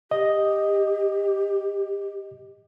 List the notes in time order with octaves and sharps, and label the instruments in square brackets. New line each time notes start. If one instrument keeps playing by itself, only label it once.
[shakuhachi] G4 [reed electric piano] D#5